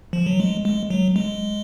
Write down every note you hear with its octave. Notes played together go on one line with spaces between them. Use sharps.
F3
F#3
G#3
G#3
F#3
G#3